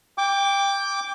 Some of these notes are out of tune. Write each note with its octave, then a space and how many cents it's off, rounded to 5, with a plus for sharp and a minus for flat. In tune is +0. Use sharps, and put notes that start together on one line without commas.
G5 +20 D6 -10